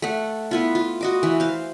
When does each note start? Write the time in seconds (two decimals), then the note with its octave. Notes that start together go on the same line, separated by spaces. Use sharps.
0.02 A3 F#5
0.51 B3 E4 F4
0.75 F4
1.01 F#4 D#5 D6
1.23 E3
1.40 C5 F5